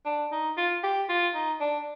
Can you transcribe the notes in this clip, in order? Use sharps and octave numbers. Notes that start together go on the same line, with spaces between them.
D4
D#4
F4
G4
F4
D#4
D4